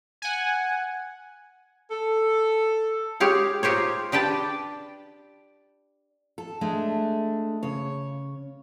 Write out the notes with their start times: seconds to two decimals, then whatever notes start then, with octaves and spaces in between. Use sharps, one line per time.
0.22 F#5 G#5
1.90 A4
3.20 G#3 G4 C#5 F5
3.63 D#4 F4 G4 C5 C#5
4.12 D4 G4 B4 G5 A5
6.38 A4
6.61 G#3 A3 D4
7.63 C#3 C#5